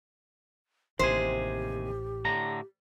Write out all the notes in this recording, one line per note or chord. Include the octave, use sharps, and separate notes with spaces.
A1 D#2 C3 G4 G#4 C5
A2 D3 A#5